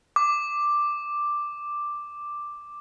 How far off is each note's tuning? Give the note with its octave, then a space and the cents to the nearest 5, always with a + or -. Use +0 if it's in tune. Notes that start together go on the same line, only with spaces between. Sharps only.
D6 +5